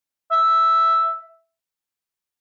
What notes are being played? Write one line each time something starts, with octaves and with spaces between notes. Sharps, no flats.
E5